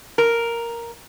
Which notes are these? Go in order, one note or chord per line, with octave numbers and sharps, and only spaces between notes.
A#4